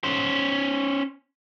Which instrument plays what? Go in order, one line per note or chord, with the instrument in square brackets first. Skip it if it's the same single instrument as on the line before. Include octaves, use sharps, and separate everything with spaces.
[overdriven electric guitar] C#4 C5